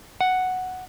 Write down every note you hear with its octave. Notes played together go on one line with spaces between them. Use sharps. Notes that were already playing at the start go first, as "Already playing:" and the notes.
F#5